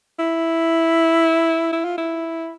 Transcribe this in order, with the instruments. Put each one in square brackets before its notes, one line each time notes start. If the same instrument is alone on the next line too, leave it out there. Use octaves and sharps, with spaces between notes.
[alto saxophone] E4
E4
F4
E4